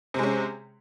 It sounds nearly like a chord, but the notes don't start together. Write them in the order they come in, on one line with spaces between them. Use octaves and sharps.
C3 G#3 C#4